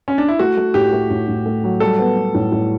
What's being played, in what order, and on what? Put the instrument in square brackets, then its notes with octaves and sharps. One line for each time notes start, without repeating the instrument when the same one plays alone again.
[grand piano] C#4
D4
E4
[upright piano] A3 [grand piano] F#4
[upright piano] A3
[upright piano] A2 [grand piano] G4
[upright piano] A3
A2
A2
A3
F#3
[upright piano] G3 [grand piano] A4
[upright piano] B3
B3
A2
A2